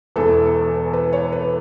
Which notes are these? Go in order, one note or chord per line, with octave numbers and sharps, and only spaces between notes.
E1 E2 E3 A4
B4
C#5
B4